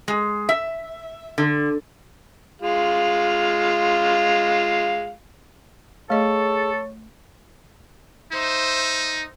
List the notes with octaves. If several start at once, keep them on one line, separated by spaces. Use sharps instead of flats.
G#3
E5
D3
G#3 F4 F5
A3 G#4 A4 C#5 D#5
D#4 C5 E5